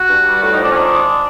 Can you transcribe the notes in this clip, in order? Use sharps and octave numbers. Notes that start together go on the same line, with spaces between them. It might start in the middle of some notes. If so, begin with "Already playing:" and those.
Already playing: F#4
G2
G3
A2 F#4
D#4
F3
D4
C#4
D#3 D4
G#3